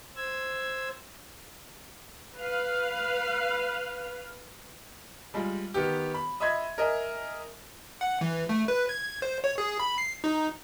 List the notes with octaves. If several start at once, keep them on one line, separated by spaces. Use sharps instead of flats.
C5 E6 G#6
B4 F5
G3 G#3 F4
D#3 B3 G4
B5
D#5 E5 B5 C6 G#6
A#4 D#5 E5 G#5
F#5
E3
A3
B4
G#6
C5
C#5
G#4
B5
C7
D#4